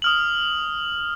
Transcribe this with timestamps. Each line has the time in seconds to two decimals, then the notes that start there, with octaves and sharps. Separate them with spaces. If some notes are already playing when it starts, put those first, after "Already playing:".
0.02 D#6 F6 F#7